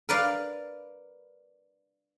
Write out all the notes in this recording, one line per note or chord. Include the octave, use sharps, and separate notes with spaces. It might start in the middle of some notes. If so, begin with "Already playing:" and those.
A#4 B4 D5 F5